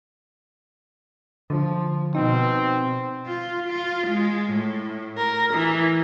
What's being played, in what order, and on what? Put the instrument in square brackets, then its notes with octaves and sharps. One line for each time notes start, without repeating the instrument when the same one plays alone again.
[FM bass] D3 [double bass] F3
[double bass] B2 [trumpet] C4 [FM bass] D#4
[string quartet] F4
F4
G#3
A2
A#4
E3